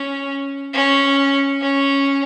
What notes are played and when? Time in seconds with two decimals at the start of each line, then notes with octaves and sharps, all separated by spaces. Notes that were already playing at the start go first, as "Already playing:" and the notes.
Already playing: C#4
0.74 C#4
1.61 C#4